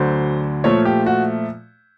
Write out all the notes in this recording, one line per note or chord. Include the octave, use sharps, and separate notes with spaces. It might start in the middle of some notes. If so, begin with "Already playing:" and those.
Already playing: D2 D3 F#3 C5
A#2 F3 A3 C#5
G4
F#4